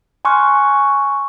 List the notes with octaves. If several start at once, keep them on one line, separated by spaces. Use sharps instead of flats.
G#5 C6 C#6 F6 F#6